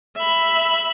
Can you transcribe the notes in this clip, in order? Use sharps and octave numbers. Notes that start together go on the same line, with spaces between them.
E5 B5